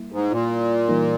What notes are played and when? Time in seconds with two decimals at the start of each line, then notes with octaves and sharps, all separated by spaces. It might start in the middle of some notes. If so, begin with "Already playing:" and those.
Already playing: G3 A#3 E4
0.12 G#2
0.31 A#2
0.88 E3 G3 A#3 D#4 A#4